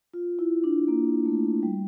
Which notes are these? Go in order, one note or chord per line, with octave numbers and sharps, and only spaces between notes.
F4
E4
D4
A#3
A3
G3